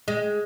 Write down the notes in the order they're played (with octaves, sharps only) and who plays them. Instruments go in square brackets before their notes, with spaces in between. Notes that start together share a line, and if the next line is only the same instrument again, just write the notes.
[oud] G#3